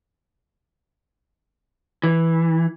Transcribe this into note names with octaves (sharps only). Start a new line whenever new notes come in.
E3